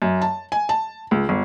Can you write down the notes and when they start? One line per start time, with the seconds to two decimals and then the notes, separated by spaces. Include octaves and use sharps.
0.02 F#2
0.22 A5
0.52 G#5
0.69 A5
1.11 C#2
1.29 G1